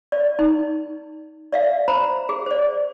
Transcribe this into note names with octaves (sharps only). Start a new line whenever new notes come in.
D5
D#4
D5 E5 F5
C5 A#5 B5
G#4
C5 D5